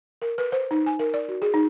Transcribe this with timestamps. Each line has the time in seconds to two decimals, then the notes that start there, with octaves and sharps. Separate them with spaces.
0.22 A#4
0.38 B4
0.52 C5
0.71 D#4
0.86 G#5
0.99 A#4
1.14 D5
1.28 F#4
1.42 G#4
1.54 D#4